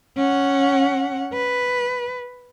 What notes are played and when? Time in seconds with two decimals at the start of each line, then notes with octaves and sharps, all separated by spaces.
0.17 C#4 F#5
1.33 B4